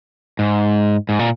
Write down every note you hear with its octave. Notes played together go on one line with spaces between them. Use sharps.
G#2
G#2
A#2